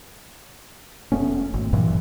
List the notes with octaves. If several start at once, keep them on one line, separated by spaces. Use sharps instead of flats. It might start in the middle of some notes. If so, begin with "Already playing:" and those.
F1 A3 B3 C#4
G#1
G2 A#2 E3 F#3